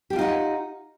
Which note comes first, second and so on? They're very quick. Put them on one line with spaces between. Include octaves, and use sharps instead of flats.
G4 D4 F4 D#4 F#5